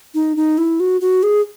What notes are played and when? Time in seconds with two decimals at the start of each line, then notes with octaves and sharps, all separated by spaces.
0.15 D#4
0.37 D#4
0.58 E4
0.80 F#4
1.01 F#4
1.23 G#4